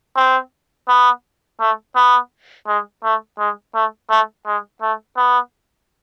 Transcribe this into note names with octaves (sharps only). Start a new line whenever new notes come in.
C4
B3
A3
B3
G#3
A3
G#3
A3
A3
G#3
A3
B3